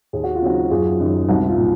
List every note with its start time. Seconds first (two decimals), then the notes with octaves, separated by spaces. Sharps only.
0.13 D#2 G#4
0.23 F#4
0.35 F4
0.42 C#3 F#3 C4 D#4 F#4
0.71 F#1 F4 G#4
1.00 F#2 D#3
1.29 C2 D#4 F#4
1.48 F4
1.58 A#2